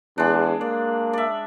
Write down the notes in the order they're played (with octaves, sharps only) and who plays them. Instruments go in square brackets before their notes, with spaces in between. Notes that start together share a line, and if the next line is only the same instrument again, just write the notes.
[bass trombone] E2 [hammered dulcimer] G#3 D4
[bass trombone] A#3 [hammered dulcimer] D5
[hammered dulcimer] D5 E5